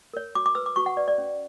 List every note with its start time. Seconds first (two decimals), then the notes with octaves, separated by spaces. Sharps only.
0.14 A#4 C#5
0.35 F#4 D6
0.46 D6
0.55 B4 E6
0.66 D6
0.76 F#4 C#6
0.86 F#5
0.97 B4 D5
1.08 D5
1.18 C#4